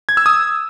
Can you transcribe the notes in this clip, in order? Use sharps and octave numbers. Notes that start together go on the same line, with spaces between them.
G#6
E6
D#6